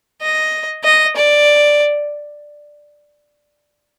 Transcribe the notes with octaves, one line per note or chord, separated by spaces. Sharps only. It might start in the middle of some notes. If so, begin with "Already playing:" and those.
D#5
D#5
D5